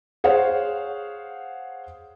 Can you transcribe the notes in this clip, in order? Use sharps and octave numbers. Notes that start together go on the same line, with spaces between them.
G#4 C5 C#5 F5 F#5